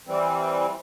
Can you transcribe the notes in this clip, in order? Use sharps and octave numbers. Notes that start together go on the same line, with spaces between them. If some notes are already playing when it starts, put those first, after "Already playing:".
E3 G3 C4